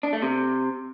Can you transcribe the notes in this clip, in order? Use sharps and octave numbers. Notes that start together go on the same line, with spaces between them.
D4
A3
C3